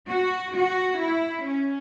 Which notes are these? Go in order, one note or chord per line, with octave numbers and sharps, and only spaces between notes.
F#4
F#4
E4
C#4